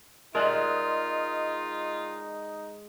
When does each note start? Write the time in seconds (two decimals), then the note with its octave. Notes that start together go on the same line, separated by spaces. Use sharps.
0.35 G#3 D#4 F4 A#4 D5 E5